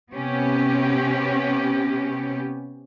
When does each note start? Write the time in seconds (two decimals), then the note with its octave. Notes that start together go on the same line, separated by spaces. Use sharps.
0.11 C3 B3 C#4 G4